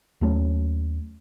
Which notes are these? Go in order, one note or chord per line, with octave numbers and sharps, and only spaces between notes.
D#2 F#3 A3 C#4